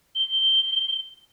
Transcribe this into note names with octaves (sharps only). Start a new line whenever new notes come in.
G7